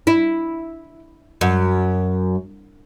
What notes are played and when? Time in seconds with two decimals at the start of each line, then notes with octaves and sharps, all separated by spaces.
0.07 E4
1.41 F#2